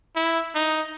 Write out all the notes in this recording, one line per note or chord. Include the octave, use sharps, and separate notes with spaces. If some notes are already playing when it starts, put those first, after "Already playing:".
E4
D#4